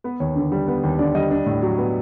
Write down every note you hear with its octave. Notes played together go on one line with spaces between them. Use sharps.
B3 B4
D#2 C#5
D3
G3
B3
D#2
D3 D5
G3 D#5
D4
A2
F#3
B3